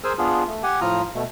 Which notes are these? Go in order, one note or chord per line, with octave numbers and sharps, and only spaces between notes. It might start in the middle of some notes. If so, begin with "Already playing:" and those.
G#4 A#4 C5 G#5 E6
B3 D4 F4 G#4
A3
G4 F#5 G#5
A2 F3 F4 A#5 D#6 F6
B2 A3